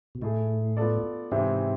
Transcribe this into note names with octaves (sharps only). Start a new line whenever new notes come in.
B2
A2 A3 E4 G#4
B3 F4 A4 D5
G#2 C3 E3 G#3 C4